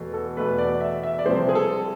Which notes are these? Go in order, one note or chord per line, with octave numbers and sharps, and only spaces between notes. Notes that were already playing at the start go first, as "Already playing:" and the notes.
Already playing: E2 B2 A3
A4
E2 B2 A3 B4
D5
E5
E5
D5
C2 C3 F3 G#3 C5
G#4
A4